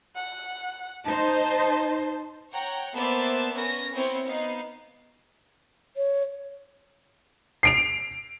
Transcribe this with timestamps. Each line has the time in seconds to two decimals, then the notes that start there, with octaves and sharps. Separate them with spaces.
0.16 F#5
1.05 D#4 C5 A5
2.52 C#5 F#5 G5 A#5
2.95 A#3 B3 C5 D5 E5 A5
3.53 B3 C#4 A#4 A#6
3.93 B3 C4 E4 C5 C#5 C#7
4.25 B3 D#4 F5
5.96 C#5
7.63 C7 D7 F7